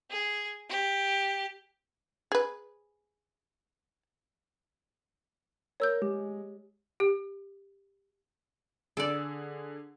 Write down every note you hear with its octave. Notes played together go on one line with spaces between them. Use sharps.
G#4
G4
G#4 B4
A#4 C#5 E6 G6
G#3 G4
G4
D3 G#4 A4 D5